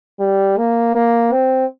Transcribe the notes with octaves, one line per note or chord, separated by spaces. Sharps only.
G3
A#3
A#3
C4